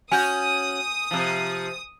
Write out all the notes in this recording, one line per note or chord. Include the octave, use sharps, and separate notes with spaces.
C#4 F#4 G#5 D#6 G6
C3 F3